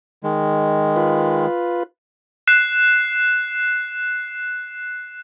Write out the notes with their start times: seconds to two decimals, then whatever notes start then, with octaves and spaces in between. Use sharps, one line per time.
0.24 D#3 G#3
0.96 F4 B4
2.47 F#6 C7 E7